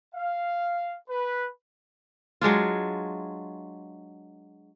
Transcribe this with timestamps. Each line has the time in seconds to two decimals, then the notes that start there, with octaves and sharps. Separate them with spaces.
0.14 F5
1.09 B4
2.41 F#3 G#3 D4 F4